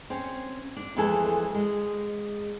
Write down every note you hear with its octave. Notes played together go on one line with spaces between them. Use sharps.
C4 C#4 C#5
D4
F2 E3 G#3 A3 A4 G#5
G#3